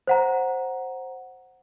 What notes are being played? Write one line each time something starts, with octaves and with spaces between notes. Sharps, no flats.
C5 F#5 A#5